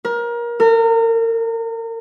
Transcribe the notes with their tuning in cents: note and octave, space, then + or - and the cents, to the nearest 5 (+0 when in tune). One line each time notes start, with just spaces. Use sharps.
A#4 +25
A#4 -35